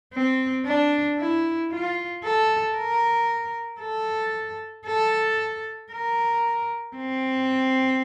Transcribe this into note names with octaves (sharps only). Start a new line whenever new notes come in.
C4
D4
E4
F4
A4
A#4
A4
A4
A#4
C4